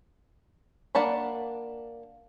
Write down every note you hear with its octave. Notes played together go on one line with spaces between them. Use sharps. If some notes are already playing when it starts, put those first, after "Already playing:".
A#3 D4 F#5 A5 B5